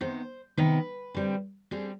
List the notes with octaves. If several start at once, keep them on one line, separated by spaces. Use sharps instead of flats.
C3 D#3 B3 C5
C3 D#3 B3 B4
D3 G3 C4
D3 G3 C4 G#4